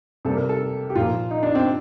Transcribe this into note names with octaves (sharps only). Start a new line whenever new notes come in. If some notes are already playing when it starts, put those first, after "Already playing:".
C3 G3 A#3 A4
A#4
A4
G4
A#2 F3 A#3 F4
D#4
D4
C4